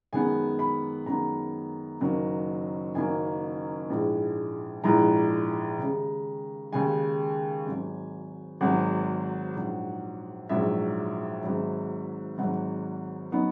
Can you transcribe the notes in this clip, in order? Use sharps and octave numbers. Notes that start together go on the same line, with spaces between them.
F#2 D#3 G#3 B3 G#5
B5
F#2 D#3 G#3 B3 A#5
F#1 F#2 D#3 F#3 A#3
F#1 F#2 D#3 F#3 A#3 G#5
A#1 G#2 E3 G#3
A#1 G#2 E3 G#3 A#5
D#2 C#3 G#3
D#2 C#3 G#3 G#5
G#1 G#2 F#3
G#1 G#2 F#3 F#5
A#1 G#2 F#3
A#1 G#2 F#3 E5
G#1 G#2 F#3
G#1 G#2 F#3 F#5
F#3 B3 D#4